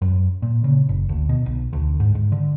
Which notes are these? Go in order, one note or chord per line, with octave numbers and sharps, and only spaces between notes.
F#2
A#2
C#3
F#1
D2
B2
B1
D2
G#2
G#2
D3